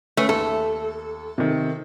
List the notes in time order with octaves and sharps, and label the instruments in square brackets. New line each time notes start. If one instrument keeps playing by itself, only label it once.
[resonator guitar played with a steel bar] A3 [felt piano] C#4 B4
[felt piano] D#2 [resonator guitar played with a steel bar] A4
[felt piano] C3 D#3